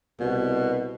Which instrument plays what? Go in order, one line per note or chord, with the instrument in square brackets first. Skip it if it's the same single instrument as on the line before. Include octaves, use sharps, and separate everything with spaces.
[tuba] C2 [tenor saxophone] B2